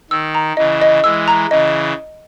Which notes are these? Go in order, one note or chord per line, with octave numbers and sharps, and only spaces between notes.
D#3 E6
A#5
C#3 E3 D#5
D#5
E3 G#3 E6
A#5
C#3 E3 D#5